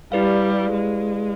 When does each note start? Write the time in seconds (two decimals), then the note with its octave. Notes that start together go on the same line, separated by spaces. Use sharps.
0.12 G3 E4 G4 B4 D5 F5
0.73 G#3